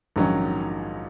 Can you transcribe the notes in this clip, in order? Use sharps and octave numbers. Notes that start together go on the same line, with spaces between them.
A#1 G#2 D#3 F#3 C#4